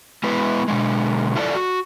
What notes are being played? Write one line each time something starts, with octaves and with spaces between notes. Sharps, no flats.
G#3 B3 E4 B4
B2 D3 G#3
E4 F4 A4 A#4 D5
F#4